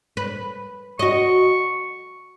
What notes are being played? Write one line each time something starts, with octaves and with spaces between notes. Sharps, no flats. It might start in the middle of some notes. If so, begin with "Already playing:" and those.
B4
F#4 D#5 C#6